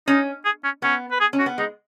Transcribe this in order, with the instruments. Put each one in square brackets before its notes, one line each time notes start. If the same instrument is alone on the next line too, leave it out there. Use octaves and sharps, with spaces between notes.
[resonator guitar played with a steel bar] C#4 [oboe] D#4
[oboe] G#4
C#4
[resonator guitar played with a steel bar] B3 [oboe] C#4
[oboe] B4
G#4
[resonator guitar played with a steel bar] C#4
[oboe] F#4
[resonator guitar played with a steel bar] B3
[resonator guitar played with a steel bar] G#3 [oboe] D#4